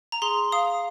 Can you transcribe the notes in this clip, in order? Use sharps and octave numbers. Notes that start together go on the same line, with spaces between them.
A#5
G#4 C6
F5 D#6